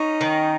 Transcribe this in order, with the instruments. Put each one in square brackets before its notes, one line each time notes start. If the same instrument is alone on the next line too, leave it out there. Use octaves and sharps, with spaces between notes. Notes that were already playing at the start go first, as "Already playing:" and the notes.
Already playing: [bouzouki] C#4 [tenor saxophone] D#4
[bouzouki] D#3